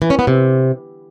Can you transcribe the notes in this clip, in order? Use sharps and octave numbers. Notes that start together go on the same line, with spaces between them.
E3
C#4
B3
C3